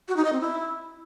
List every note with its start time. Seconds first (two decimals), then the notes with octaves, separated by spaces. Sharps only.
0.08 F#4
0.17 D#4
0.25 D#5
0.33 C4
0.41 E4